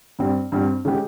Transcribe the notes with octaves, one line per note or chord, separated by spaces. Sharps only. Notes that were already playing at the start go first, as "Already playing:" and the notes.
G2 G3 C4
G2 G3 C4
C#3 G#3 C#4 G4